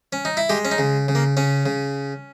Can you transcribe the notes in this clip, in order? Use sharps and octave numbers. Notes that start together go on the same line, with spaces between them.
C#4
D#4
E4
G#3 G4
C#4
D#4
C#3
C#3
A#3
C#3 C#4
C#3